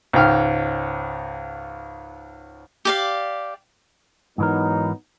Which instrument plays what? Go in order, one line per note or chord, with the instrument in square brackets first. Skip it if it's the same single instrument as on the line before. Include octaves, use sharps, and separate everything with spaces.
[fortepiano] C#2 G#2 G5 F6
[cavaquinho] G4 D5 F5
[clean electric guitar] G#2 E3 A#4 [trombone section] F#3 B3 D#4